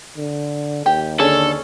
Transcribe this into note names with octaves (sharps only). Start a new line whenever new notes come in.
D3
D#2 G4
D3 C#4 G#4 A4